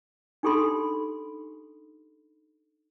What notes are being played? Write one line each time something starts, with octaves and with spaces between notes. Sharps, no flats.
D4 D#4 G4 A4 B5 C6